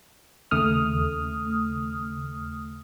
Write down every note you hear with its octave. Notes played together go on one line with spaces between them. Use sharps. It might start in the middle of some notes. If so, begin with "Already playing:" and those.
D#2 C#3 A3 D#6 F6